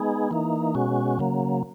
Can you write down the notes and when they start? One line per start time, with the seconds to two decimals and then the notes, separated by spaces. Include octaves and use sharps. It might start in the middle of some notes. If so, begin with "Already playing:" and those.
Already playing: G#3 B3 D#4 G#4
0.31 E3 A#3 D#4
0.75 B2 G#3 C#4 F#4
1.19 C#3 F#3 A#3